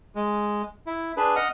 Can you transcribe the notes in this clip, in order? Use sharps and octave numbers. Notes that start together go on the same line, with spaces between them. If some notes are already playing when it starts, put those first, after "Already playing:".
G#3
E4
D4 G#4 B4
D#5 F#5 F6